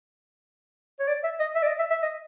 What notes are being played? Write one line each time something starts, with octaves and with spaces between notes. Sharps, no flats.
C#5
D5
E5
D#5
E5
D5
D#5
E5
E5
D#5